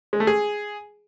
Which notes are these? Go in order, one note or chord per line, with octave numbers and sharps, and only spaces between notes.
G#3
A3
G#4